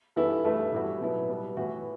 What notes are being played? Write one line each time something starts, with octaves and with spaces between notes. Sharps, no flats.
G2 E3 B3 E4 A4
G2 E3 A3 E4
A2 E3 G3 B3 F#4
B2 F#3 B3 E4
B2 G3 B3
A2 E3 B3 F#4